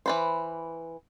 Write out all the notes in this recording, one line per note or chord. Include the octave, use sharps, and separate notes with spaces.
E3 B4 C5